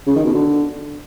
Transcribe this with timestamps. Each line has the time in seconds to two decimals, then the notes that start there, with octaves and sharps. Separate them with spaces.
0.07 C#3
0.16 D#3
0.25 B2
0.34 D3